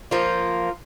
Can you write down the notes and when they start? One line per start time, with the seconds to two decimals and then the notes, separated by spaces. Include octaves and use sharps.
0.11 F3 A#3 F4